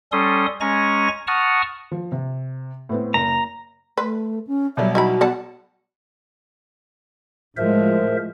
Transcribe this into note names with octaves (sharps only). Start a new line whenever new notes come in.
G3 C#4 A4 C6 D#6
G#3 C#4 G#5 A#5 C#6 A#6
F#5 A5 A#5 C#6 D#6 F6
F3
C3
A2 B3 C4
F#1 A#5
A3 B4
C#4
B2 F#3 G3 E5
D#4 E4 F#4 B5
B3 F#5 A5
A2 F3 G#3 A#4 C5 E5